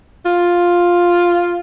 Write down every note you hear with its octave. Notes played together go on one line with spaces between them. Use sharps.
F4